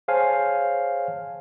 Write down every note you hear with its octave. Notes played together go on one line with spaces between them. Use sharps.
G#4 C5 C#5 F5 G#5 A5